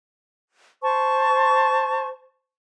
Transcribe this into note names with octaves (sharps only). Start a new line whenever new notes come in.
C5 A5 C#6